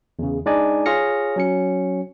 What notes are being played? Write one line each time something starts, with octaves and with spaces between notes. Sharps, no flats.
E2 C#3
G#3 D4 D#4 D5 D#5 G#5
F4 G#4 C#5 F6 A#6 C#7
F#3 C#4 C#7